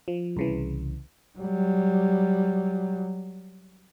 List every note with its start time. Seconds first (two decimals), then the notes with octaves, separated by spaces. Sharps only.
0.08 F3
0.37 C2 C#3 E3
1.39 F#3 G3